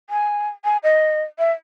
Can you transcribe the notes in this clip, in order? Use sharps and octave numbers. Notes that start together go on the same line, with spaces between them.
G#5
G#5
D#5
E5